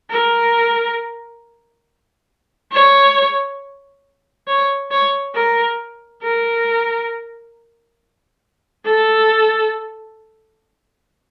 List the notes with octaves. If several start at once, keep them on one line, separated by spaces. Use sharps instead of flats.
A#4
C#5
C#5
C#5
A#4
A#4
A4